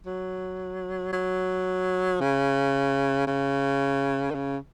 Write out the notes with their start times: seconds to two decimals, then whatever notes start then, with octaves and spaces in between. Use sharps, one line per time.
0.06 F#3
1.13 F#3
2.21 C#3
3.27 C#3
4.31 D#3
4.34 C#3